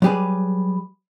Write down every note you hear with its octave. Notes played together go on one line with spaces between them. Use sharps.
F#3 G3 G4 G#4 B4